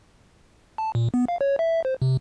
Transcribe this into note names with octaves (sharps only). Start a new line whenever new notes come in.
A5
A#2
B3
F5
C#5
E5
C5
C3